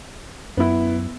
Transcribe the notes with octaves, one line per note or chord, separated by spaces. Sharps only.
F#2 B3 E4